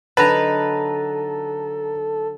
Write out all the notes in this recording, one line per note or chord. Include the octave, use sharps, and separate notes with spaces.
D3 F#3 D#4 A4 B4 A5 A#5